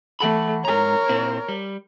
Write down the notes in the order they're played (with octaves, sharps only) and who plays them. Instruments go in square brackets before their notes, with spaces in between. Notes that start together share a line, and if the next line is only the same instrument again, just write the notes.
[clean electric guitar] E3 F#5 B5 [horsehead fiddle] A3
[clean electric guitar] G#2 A#5 [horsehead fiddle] A#4 C#5
[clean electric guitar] A#2 C4 E4
G3